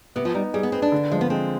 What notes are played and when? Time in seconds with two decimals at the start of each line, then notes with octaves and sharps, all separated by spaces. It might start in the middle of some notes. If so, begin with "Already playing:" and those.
0.16 C3 B3
0.25 F3
0.35 G3 D#4
0.54 G3 G#4
0.63 B3
0.72 C4 B4
0.82 D4
0.92 D3
1.11 F3 G#3
1.21 B3
1.30 G#3 C4